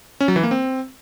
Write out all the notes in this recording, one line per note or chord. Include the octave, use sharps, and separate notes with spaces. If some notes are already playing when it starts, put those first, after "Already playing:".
C#4
F#3
E3
A#3
C4